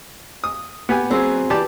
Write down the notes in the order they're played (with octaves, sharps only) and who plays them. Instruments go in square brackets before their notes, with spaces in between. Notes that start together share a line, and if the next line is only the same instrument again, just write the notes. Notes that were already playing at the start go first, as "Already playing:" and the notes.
[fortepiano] D#6
B3 G4 G#5
[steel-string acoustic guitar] F#3 C4 G#4
[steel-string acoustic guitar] E3 [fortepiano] G4 D5 A5